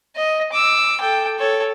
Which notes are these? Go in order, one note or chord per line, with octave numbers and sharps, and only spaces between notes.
D#5
D6 E6
A4 G5
A4 C#5